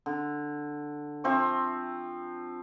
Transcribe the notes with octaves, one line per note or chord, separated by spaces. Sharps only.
D3
F3 C4 E5 C#6